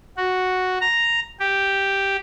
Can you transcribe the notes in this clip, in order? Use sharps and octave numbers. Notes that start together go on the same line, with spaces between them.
F#4
A#5
G4